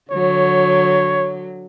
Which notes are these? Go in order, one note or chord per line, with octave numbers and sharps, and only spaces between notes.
D3 F#3 C#5